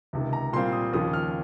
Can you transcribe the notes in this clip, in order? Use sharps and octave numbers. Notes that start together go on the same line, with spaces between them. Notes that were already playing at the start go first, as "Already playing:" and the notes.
C#2 C3 D#3
A#5
A#2 G3 C4 F4 C6
D#6
D#2 C#3 F3 D#6
F6